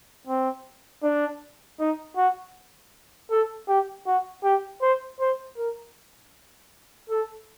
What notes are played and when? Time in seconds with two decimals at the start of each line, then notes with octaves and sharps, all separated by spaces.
0.27 C4
1.03 D4
1.79 D#4
2.17 F#4
3.30 A4
3.68 G4
4.06 F#4
4.44 G4
4.82 C5
5.20 C5
5.57 A#4
7.10 A4